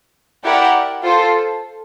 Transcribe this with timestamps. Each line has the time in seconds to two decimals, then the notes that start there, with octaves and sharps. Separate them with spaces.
0.44 E4 G4 A#4 D5 F#5
1.02 F4 A4 C5